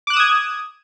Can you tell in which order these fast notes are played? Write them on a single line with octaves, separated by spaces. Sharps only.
D6 F#6 E7 D#6 G#6